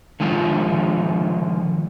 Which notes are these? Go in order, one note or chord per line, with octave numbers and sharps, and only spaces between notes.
D3 D#3 F3 G#3 F4